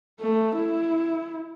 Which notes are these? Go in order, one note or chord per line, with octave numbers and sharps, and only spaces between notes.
A3
E4